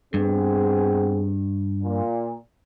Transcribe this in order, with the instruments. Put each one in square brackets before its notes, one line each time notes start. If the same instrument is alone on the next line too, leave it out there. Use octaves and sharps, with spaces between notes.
[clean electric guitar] G2 [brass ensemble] B3 C4 G#4
[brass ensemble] A#2